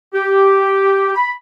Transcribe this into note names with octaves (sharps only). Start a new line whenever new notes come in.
G4
B5